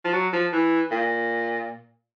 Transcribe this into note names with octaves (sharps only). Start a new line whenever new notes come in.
F3
F#3
F3
E3
A#2